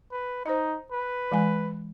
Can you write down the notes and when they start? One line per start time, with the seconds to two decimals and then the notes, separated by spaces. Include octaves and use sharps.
0.12 B4
0.46 D#4 C5 D#5
0.92 B4
1.31 E3 G#3 G#5